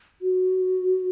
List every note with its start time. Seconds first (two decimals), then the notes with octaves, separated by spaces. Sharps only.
0.22 F#4